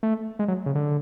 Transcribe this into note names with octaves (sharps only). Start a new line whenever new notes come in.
A3
G#3
F#3
C#3
D3